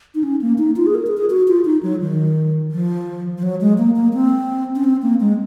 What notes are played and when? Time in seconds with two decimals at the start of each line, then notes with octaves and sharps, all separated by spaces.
0.15 D#4
0.23 C#4
0.42 A#3
0.58 D#4
0.76 F4
0.86 G#4
0.95 A#4
1.07 G#4
1.17 G#4
1.30 F#4
1.48 F4
1.65 D#4
1.83 F#3
2.01 D#3
2.72 F3
3.38 F3
3.43 F#3
3.61 G#3
3.78 A#3
3.96 A#3
4.14 C4
4.76 C#4
4.84 C4
5.02 A#3
5.20 G#3